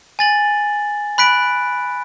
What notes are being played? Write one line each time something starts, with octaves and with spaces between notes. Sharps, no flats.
G#5 A6 F#7
B5 F#6 B6 D7